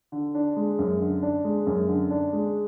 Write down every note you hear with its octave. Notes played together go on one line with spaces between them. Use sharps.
D3
D4
G#3
F#2
D3
D4
G#3
F#2
D3
D4
G#3